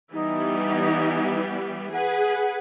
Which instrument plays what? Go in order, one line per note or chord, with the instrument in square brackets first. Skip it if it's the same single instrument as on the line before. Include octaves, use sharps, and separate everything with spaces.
[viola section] E3 G3 B3 [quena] D#4
[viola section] G#4 B4 [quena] F#5